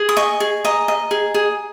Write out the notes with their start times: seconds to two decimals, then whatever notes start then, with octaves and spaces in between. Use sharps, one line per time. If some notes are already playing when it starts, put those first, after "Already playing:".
Already playing: G#4
0.09 D#6
0.17 D#5 C#6
0.40 G#4
0.65 D#5 A#5
0.88 D#5
1.11 G#4
1.34 G#4